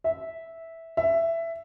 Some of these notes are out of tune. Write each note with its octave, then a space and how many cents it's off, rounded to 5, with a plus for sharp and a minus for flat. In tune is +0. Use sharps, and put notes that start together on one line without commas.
E5 -10
E5 +10